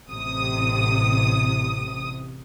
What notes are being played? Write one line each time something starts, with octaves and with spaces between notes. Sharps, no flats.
A1 C3 D#6